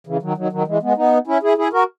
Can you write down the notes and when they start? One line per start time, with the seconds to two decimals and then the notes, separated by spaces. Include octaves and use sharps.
0.07 C#3 E3
0.22 D#3 F#3
0.37 D#3 F#3
0.52 D#3 F#3
0.67 E3 G#3
0.83 G#3 B3
0.97 B3 D#4
1.27 C#4 E4
1.43 E4 G#4
1.58 E4 G#4
1.73 F#4 A#4